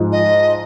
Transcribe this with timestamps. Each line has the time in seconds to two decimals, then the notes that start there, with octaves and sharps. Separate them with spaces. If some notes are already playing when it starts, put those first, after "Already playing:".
Already playing: G#2 F3 G#3
0.12 D#5